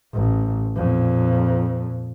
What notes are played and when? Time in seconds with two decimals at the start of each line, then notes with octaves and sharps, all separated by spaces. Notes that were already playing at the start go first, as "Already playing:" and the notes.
0.13 A1
0.76 F2 A#2